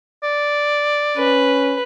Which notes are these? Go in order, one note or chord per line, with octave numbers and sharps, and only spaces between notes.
D5
C#4 B4